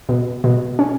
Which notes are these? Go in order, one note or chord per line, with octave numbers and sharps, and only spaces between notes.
B2
B2
C#4